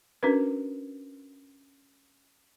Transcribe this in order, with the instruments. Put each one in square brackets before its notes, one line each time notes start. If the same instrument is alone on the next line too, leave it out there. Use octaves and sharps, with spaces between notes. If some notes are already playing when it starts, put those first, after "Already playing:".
[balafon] C#4 D4 F#4 A#4 B4